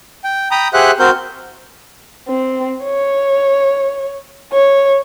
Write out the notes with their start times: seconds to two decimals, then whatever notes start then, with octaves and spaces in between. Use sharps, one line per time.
0.24 G5
0.51 G5 A#5 B5 D#6
0.74 G4 G#4 C5 E5 F#5 F#6
0.99 C4 F#4 A#4 C5 G6
2.29 C4
2.84 C#5
4.53 C#5